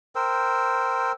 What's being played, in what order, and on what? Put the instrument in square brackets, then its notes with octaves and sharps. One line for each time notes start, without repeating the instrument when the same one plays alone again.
[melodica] A#4 C5 G5 E6